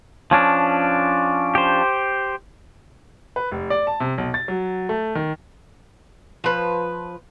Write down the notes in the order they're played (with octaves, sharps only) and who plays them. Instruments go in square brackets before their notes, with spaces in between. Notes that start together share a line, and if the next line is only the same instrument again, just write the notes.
[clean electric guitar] F3 C#4 D4
[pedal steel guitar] G4 C5
[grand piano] B4
F1
D5
A5
C3
B1
A6
F#3
A3
D#3
[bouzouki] F3 B4